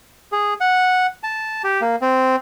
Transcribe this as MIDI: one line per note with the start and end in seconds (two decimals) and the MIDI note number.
0.32 0.54 68
0.61 1.07 78
1.23 1.62 81
1.64 1.81 67
1.81 1.96 58
2.02 2.36 60